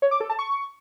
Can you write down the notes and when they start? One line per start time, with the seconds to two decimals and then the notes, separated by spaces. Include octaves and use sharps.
0.02 C#5
0.11 D6
0.20 A4
0.30 A5
0.39 C#6